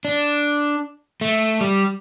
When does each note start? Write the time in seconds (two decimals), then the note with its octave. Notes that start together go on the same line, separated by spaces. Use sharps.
0.05 D4
1.21 A3
1.61 G3